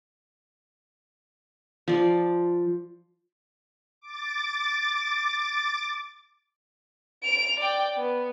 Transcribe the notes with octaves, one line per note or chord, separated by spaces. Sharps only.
F3 D5
D6 A6
D7 F7
D5 G5
B3